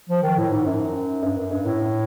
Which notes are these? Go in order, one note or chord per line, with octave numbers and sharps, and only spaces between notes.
F3
D#3
A2
G#2
F#2
G2
F#2
G2
A2